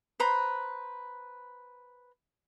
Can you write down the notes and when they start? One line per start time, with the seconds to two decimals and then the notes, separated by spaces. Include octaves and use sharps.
0.20 B4 C5 A#5 B5